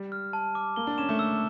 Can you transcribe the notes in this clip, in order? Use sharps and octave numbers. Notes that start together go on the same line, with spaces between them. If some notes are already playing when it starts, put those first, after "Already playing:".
Already playing: G3
F6
A5
D6
A#3 G7
D4
C#4 E7
A3
E6